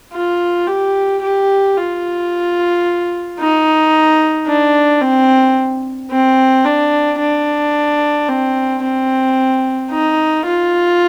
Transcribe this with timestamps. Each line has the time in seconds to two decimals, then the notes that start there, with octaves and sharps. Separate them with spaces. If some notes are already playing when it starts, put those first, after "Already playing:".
0.13 F4
0.67 G4
1.22 G4
1.77 F4
3.40 D#4
4.47 D4
5.01 C4
6.11 C4
6.65 D4
7.19 D4
8.29 C4
8.83 C4
9.91 D#4
10.46 F4